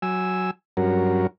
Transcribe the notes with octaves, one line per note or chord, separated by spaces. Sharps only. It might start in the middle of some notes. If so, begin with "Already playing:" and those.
F#3 G#5 E6
G2 F#3 C#4 F#4 A#4